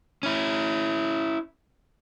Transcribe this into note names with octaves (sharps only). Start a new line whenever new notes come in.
C#4 E4